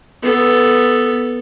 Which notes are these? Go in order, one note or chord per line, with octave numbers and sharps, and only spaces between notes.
B3 A4